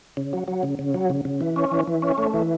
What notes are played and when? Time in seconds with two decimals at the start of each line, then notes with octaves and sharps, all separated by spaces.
0.17 C#3
0.33 F#3
0.48 F#3
0.63 C#3
0.79 C#3
0.94 F#3
1.10 C#3
1.25 C#3
1.41 E3
1.56 C#4
1.72 E3
1.87 E3
2.02 C#4
2.18 A3
2.34 E3